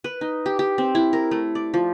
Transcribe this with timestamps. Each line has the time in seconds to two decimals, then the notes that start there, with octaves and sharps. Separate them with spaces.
0.04 B4
0.21 D#4
0.46 G4
0.59 G4
0.78 C4
0.95 E4
1.13 A#4
1.31 A3
1.55 D5
1.74 F3